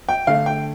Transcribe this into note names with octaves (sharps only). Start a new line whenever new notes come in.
G5
D3 A3 F5
G5